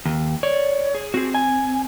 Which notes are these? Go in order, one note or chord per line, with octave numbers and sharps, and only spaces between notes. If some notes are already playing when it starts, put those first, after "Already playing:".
D#2
C#5 D5
G#4
C4 F#4 G#4
G#5